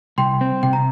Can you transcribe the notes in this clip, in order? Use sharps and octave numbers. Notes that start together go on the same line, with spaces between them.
C2 G5 C6
C4
C3 G5
A#5